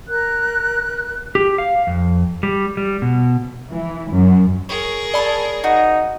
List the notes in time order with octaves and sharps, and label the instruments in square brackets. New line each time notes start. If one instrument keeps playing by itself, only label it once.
[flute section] A#4 F#6
[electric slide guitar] G4
F5
F2
G3
G3
B2
[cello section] E3
F#2
[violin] G#4 A#4 [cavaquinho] C#5
[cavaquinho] A4 C#5 A5 [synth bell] D5 B5
[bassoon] D#4 [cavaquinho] F#4